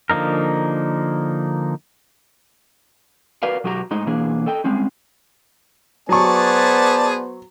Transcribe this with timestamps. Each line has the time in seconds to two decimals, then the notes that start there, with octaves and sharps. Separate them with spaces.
0.10 D3 F3 A#3 D#4 A#4
3.43 F#4 A#4 B4 D5 F5
3.64 B2 F#3 F#4 G4 A4 A#5
3.91 A2 G#3 D#4 D#5
4.06 B2 E3 A#3 D4 G#4
4.46 A4 D#5 G5
4.64 G3 G#3 C4 C#4
6.09 F#3 B3 G#4 C5 D5 A5 C#6